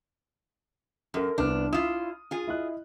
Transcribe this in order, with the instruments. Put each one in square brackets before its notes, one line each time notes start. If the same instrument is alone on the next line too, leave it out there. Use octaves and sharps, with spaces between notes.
[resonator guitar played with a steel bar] F#2 [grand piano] A4 A#4
[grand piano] C2 B3 F6 [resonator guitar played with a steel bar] D4
[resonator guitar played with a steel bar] E4 F4 [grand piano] D#6
[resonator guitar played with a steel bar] F4 G#4
[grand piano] E4 D#5 F#6